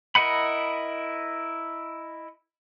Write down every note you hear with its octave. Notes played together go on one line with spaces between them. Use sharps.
E4 A#4 D#5 F#5 B5